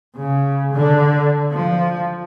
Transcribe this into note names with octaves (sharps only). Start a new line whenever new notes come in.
C#3
D3
F3